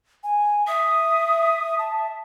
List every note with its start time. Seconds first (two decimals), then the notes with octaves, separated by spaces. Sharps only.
0.24 G#5
0.67 E5 D#6
1.79 A5